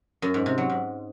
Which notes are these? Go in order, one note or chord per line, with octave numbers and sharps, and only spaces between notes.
F#2
G#2
C3
F#3
G#2